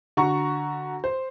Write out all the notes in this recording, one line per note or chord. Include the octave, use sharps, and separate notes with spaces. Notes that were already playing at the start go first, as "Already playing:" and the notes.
D3 F#4 A#5 C#6
C5